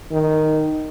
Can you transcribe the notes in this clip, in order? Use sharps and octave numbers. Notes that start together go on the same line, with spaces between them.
D#3